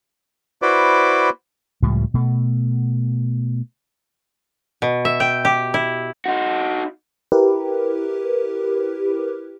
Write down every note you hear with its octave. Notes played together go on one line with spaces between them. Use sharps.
E4 F#4 B4 C5 D5 D6
C#2 A2 F3 G3
B2 A3
B2
E5
G5
G4
E4
D#4 F#4
E4 G4 A#4 B4